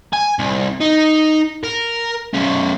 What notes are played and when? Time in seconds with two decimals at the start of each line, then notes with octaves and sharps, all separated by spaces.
0.13 G#5
0.39 C2
0.81 D#4
1.64 A#4
2.34 B1 C#4